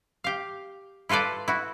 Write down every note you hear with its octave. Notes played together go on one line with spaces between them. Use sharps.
G4 F5
E4 F4 A4 B4 D5
E4 F#4